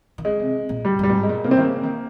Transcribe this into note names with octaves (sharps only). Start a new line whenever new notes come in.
D#3
C#3 G#3
C3
A#2
G2 G3
G2 G3
A#2
G#2
G#3
A#2
C3 A#3
C4
D#3
C#3 A#3
D#3